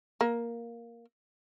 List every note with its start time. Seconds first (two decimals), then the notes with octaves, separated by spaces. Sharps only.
0.21 A#3